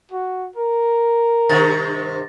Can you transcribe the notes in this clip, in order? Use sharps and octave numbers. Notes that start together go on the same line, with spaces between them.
F#4
A#4
G2 C3 D#3 A6 A#6